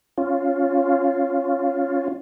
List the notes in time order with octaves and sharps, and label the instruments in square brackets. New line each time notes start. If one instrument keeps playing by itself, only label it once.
[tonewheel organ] C#4 F4